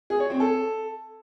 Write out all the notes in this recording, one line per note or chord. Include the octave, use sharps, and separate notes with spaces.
G#4
C#5
C4
A4